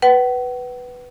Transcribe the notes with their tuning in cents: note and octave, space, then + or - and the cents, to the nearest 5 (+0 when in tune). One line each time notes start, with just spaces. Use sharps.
B4 +0 F#5 +40